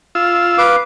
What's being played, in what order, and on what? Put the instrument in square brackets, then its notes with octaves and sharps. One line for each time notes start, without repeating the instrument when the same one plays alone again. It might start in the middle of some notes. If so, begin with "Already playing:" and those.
[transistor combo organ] F4 E6
[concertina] B4 F5 D6